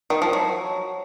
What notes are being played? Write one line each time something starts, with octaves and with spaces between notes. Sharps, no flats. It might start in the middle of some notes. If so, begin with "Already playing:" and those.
D#3
F3
F#3